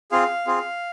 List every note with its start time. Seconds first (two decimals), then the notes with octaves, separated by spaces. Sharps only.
0.11 C4 F4 G#4 F5
0.47 C4 F4 G#4